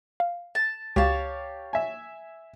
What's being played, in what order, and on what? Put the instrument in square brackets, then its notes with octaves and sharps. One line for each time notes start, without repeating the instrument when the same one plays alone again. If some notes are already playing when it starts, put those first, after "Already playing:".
[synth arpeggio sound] F5
[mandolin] A5
[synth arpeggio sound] C#2 [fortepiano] G4 F5 [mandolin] C#5 A5
[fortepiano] E5 G#5